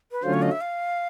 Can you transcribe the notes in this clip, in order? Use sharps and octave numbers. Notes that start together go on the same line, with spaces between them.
B4
D3 F#3 A3 C#4 F4 C5
C#5
D#5
E5
F5